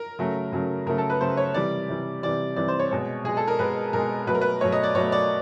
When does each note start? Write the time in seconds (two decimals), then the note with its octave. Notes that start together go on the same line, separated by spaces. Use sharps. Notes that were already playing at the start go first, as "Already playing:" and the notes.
Already playing: A#4
0.19 C#3 F#3 A3
0.52 C#3 F#3 A3
0.86 C#3 F#3 A3 A#4
0.98 A4
1.10 B4
1.21 C#3 F#3 A3 C5
1.37 C#5
1.54 C3 E3 G3 D5
1.89 C3 E3 G3
2.23 C3 E3 G3 D5
2.56 C3 E3 G3 D5
2.68 C5
2.79 C#5
2.91 B2 G#3 C#5
3.24 B2 G#3 G#4
3.37 A4
3.48 A#4
3.59 B2 G#3 B4
3.93 B2 G#3 A#4
4.27 B2 F#3 A3 B4
4.35 A#4
4.41 B4
4.61 B2 F#3 A3 C#5
4.72 D#5
4.83 D5
4.95 B2 F#3 A3 C#5
5.12 D5